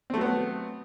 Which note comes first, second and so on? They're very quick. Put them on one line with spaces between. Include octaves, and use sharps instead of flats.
C4 A3 F#3 B3